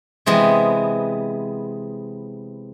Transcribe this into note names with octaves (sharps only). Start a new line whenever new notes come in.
C3 E3 G#3 B3